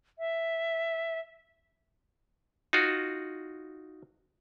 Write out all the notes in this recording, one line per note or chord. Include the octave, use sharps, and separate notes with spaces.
E5
D#4 F4 F#4